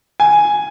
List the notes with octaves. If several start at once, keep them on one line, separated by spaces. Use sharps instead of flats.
G#5